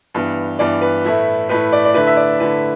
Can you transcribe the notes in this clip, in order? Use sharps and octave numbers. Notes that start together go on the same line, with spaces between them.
G2 E3 B3
G2 E3 B3 D5
B4
A2 A3 E4
A2 A3 E4 B4
D5
D5
D3 A3 E4 B4
E5
D5
D3 A3 E4 B4